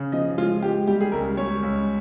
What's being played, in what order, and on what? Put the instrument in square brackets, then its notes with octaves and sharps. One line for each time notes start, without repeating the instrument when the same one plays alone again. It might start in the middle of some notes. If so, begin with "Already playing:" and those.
Already playing: [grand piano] C#3
F3 D#5
G#3 F4
G#3 G4
G3 G4
G#4
C#2 A#4
G3 C#5
C#2